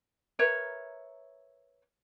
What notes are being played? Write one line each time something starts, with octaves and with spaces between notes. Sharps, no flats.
A#4 B4 C#5 E5